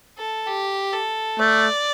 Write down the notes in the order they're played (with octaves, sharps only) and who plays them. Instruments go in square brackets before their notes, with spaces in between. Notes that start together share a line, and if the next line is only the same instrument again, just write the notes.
[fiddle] A4
G4
A4
[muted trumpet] A3 [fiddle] D5